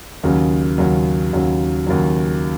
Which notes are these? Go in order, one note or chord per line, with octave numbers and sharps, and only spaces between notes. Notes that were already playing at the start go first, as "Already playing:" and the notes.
D#2 C#3 F#3
D#2 C#3 F#3
D#2 C#3 F#3
D#2 C#3 F#3